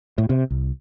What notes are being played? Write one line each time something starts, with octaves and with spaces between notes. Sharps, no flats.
A2
C3
C2